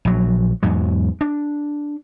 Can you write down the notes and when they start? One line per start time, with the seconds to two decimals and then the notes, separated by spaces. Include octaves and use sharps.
0.05 A#1 F#3
0.63 E2 G#2 F#3
1.21 D4